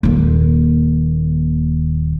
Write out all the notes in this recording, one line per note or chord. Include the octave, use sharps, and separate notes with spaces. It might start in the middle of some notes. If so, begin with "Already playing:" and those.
D#1 D#2